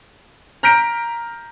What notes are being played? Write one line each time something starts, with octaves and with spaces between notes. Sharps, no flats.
A#5 F6 G6 A#6 B6 D7